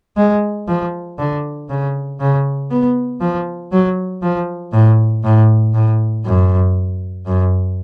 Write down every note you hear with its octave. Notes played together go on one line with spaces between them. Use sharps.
G#3
F3
D3
C#3
C#3
B3
F3
F#3
F3
A2
A2
A2
F#2
F#2